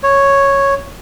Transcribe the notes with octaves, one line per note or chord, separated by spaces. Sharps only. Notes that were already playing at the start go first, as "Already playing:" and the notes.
C#5